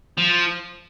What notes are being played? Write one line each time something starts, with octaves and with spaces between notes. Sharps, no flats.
F3